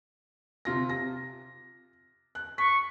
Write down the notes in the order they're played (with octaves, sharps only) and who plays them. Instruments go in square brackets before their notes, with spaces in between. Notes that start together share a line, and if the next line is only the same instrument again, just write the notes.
[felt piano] C3 F4 A#6
A#6
F#6
[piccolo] C#6 [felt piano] B6